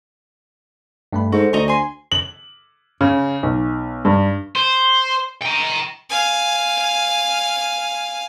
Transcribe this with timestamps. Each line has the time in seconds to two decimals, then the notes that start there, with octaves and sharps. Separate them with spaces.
1.13 G2 A3 B5
1.32 G#2 F#4 A4 C5
1.53 D2 D#5 A#5 C#6
1.68 G#5 C6
2.12 F#7
3.01 C#3
3.43 B1
4.05 G2
4.56 C5
5.42 G5 A#5
6.09 F5 G#5